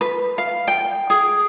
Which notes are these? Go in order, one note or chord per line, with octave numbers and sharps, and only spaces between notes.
B4
F5
G5
G#4